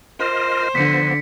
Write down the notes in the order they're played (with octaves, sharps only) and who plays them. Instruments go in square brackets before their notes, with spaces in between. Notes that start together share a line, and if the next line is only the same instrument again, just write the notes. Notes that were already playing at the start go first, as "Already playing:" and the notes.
[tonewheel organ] F4 A#4 D#5 [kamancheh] C5
[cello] D3 [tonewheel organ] F3 B3 [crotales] B6 C#7